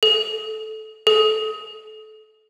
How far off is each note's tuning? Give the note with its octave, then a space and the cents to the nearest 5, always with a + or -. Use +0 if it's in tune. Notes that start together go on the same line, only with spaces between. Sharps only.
A4 -15
A4 -25